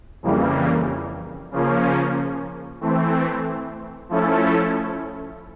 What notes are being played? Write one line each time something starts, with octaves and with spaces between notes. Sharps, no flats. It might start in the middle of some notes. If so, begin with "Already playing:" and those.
F2 C#3 E3 G3 A#3
C#3 F3 A#3 C#4
E3 A3 C4
F3 A3 C#4 E4 A4